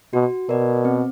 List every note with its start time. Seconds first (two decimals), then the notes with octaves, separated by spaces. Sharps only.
0.13 B2 F#4
0.49 B2 A#4 D5
0.85 C4